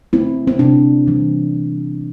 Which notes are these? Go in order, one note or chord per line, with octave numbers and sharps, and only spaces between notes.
A3 C4 E4
C4
C3 D4
E3 G3